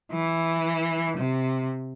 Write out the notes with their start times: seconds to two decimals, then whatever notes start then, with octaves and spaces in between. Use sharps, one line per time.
0.12 E3
1.17 C3